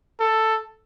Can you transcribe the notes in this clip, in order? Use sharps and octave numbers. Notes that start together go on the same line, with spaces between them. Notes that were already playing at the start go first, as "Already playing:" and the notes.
A4